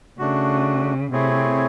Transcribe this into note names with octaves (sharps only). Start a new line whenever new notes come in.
C#3 A3 D4 F#4
C3 A3 C4 E4 G#4 C#5